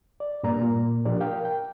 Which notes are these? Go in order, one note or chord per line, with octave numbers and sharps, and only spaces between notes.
D5
G2 A#2 A#3 D5 A#5
A#2
B2 F3 D4 G4 A#4 D5
A#4 F5 G5
G5